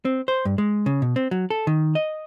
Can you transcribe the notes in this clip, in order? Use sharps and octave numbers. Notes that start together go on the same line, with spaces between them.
C4
C5
G2
G#3
C#3
B2
C4
F#3
A4
D#3
D#5